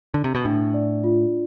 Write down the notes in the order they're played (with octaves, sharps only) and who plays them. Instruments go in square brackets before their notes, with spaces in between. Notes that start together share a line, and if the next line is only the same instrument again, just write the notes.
[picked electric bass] D3
C3
B2
[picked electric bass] A2 [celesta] D4
[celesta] D5
F4